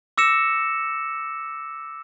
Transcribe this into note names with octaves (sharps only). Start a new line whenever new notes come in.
D6 E6 A#6 C#7 E7